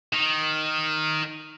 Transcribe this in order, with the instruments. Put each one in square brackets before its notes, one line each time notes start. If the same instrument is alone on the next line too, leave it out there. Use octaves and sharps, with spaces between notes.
[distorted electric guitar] D#3